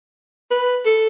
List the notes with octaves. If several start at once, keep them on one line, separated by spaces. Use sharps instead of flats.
B4
A4